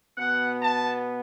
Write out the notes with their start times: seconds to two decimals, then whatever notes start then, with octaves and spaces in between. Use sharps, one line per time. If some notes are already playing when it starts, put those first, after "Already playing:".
0.18 B2 B3 F#5
0.61 A5